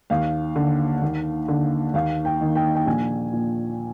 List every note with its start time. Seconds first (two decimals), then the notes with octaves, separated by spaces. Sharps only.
0.10 D#2 F5
0.56 D3
1.02 D#2
1.48 D3
1.94 D#2 F5
2.25 G5
2.41 D#3
2.55 G5
2.75 G5
2.86 A#1 G#5
3.32 A#2